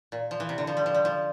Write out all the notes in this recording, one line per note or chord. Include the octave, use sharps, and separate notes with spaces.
A#2
F3
E3
C3
D3
F3
G3
F3
G3
F3